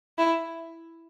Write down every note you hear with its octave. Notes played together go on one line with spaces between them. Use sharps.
E4